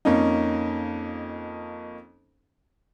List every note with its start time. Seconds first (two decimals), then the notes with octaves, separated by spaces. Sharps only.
0.05 F2 A#3 C#4 D#4